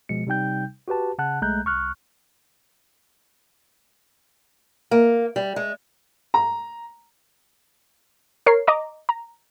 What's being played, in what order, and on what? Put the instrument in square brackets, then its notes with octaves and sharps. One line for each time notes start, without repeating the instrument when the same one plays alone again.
[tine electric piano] B2 F3 G#3 C#7
C3 G3 D#4 G5 G6
F#4 G4 B4 A5
C#3 F#5 A5 F#6
B1 G#3 A3 A#5 F#6 G6
C2 C#6 F6 F#6
[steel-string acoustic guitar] A#3
G3
G#3
[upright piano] A#5
[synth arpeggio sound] A#4 C#5 C7
D#5 A#5 D6
A#5